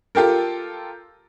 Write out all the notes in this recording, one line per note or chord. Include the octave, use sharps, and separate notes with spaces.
F4 G4 A4 A#4